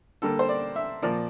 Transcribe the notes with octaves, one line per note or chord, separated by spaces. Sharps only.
D3 G3 A#3 A4
C5
D5
E5
A#2 F3 A#3 D5